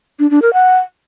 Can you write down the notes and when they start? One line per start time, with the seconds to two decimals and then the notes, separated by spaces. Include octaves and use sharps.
0.19 D4
0.31 D4
0.42 A#4
0.53 F#5